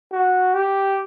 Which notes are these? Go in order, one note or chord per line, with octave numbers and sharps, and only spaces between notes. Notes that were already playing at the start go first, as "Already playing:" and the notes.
F#4
G4